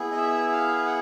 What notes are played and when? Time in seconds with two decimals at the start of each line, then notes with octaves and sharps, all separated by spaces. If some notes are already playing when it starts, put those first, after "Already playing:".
Already playing: B3 E4 G#4
0.11 D#5
0.17 E5
0.52 F5
0.86 F#5